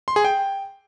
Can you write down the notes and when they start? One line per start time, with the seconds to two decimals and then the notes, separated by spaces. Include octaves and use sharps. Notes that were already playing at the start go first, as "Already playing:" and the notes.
0.08 C6
0.16 G#4
0.25 G5